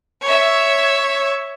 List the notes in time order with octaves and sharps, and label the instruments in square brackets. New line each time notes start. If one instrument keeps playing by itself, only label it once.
[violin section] C#5 E5